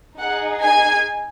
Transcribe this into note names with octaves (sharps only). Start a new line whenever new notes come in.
D#4 G#4 F#5
G#5